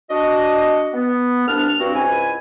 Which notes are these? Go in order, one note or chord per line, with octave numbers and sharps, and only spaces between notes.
D4 F#4 D#5
B3
C2 D4 F6
G2 C4 F#4
C#2 G#2 E4 G#5